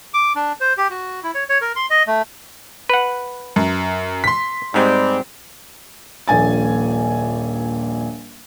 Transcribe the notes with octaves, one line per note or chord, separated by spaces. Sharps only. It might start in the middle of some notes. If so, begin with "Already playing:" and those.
D6
D4
C5
G4
F#4
E4
C#5
C#5
A#4
C6
D#5
A3
B4 F#5
F#2
C6 B6
G#2 G3 G#3 C4
D#1 A#1 G#5 A6